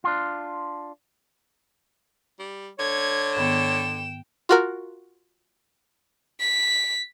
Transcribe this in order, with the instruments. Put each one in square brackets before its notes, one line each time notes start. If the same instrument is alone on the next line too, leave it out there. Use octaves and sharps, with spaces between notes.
[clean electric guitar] D4 F4
[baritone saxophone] G3
[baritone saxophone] D3 [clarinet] C#5 [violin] G#6
[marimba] G#2 D#3 B3 [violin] G5 E7
[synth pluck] F4 F#4 A#4
[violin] B6